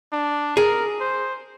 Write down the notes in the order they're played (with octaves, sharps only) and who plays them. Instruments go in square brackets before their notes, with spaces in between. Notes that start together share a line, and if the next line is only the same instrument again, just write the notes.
[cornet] D4
[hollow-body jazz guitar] G#4 [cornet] A#4
[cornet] C5